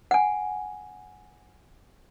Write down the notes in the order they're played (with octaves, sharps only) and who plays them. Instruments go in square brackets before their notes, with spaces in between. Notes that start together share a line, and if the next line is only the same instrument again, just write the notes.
[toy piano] F#5 G#5